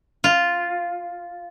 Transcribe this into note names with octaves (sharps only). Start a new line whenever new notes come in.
F4